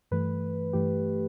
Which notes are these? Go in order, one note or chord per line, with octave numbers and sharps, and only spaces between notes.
G2 E3 A3 B4
G2 E3 A3 G4